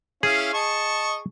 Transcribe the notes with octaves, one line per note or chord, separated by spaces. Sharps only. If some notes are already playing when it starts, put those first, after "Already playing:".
C#4 E4 G#4 F5
D#5 A5 C#6